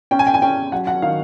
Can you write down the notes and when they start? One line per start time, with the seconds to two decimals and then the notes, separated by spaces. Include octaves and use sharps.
0.11 C#4 G5
0.19 G#5
0.27 G5
0.34 G#5
0.42 C#4 G5
0.72 F#3 F#5
0.87 F#5
1.02 D#3 F5